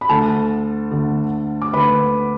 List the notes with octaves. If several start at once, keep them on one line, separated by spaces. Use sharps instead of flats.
B5
D2 D3 A4 A5
D2 D3
D6
D2 D3 B4 B5